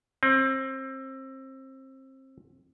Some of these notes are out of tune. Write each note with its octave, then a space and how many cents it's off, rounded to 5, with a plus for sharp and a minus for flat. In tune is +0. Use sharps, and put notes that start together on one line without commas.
C4 +25